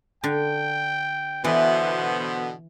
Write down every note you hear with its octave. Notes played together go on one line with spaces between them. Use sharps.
D3 G5
B2 D3 E3 B3 C5